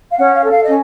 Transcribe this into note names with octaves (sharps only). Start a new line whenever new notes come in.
F5
C#4 F#5
F5
A4
F5
C#4 D#5